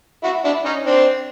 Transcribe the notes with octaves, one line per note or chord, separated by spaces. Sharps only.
E4 F#4
D4 E4
C#4 D#4
C4 D4